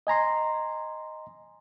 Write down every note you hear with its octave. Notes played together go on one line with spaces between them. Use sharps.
D#5 G#5 A#5 C6